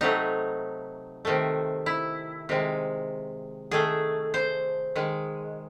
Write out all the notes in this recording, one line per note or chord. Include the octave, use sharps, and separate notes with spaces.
C3 F#3 A3 D#4
C3 D#3 A3
E4
C3 D#3 G#3
D#3 A3 G#4
C5
D#3 G#3